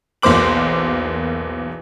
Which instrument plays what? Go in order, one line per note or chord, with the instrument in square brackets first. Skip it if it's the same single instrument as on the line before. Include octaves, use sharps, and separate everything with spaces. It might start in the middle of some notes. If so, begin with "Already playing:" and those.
[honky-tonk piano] B1 E2 A#3 C5 D6 F#7